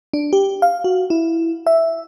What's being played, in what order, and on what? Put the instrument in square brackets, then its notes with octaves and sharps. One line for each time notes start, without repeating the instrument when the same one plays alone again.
[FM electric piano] D4
G4
F5
F#4
E4
E5